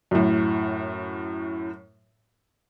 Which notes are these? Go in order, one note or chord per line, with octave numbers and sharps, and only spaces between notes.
F#2 A2